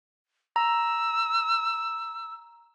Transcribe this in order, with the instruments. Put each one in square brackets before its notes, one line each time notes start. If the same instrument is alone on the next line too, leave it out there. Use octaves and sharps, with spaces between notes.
[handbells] A#5 [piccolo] E6